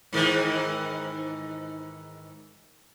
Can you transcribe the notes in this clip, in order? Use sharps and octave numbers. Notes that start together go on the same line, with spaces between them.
G#2 D#3 E3